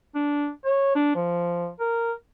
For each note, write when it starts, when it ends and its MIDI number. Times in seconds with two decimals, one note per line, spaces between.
0.15 0.49 62
0.65 0.95 73
0.95 1.15 62
1.15 1.69 53
1.80 2.12 70